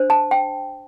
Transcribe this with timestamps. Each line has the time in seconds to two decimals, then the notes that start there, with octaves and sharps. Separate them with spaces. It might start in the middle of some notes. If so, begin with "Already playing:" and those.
Already playing: D4 C5
0.10 A5
0.31 G5